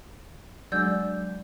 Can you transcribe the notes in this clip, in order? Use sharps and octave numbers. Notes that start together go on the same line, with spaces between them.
F#3 G#3 D4 D5 E6 G6